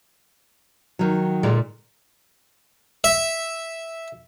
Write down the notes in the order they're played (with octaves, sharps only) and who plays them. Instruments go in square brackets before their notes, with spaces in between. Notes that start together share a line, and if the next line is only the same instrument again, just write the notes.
[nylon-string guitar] D#3 F#3
[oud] A#2 D3 G#3
[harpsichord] E5